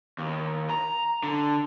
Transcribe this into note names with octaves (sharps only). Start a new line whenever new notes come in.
D#2
A#5
D3